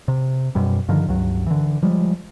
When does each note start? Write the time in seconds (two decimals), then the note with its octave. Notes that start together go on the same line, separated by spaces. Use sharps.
0.08 C3
0.55 F#2 B2 G3
0.88 G2 D3 D#3 F3
1.08 C#2 G2 F#3
1.47 D3 E3
1.83 F3 G3 G#3